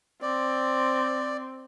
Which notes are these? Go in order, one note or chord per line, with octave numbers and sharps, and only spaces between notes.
C4 D5